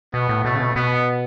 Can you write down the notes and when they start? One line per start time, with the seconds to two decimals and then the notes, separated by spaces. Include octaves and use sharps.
0.14 B2 B3
0.29 A2
0.44 B2 A3
0.55 C#3
0.60 B2
0.76 B2 B3